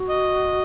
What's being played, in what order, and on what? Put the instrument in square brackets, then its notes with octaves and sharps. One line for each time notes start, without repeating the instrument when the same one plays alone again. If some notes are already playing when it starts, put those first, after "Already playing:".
Already playing: [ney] F#4
[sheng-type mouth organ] D#5